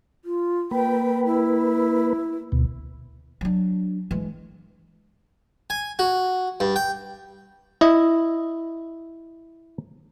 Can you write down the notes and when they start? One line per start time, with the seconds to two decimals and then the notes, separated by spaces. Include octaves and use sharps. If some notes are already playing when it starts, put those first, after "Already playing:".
0.25 F4
0.71 A#3 B4 G5
1.26 E4
2.52 D2 B2
3.41 F#3 D4
4.11 E3 G#3
5.70 G#5
5.99 F#4
6.60 G2
6.76 G5
7.81 E4 D#5